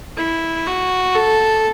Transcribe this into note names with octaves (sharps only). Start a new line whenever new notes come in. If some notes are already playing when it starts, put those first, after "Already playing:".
E4
F#4
A4